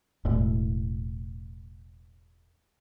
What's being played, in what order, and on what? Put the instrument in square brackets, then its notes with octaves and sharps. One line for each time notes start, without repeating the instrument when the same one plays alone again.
[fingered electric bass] E1 A2